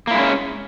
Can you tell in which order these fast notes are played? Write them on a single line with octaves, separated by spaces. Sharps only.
A#3 E4 G#3 C#4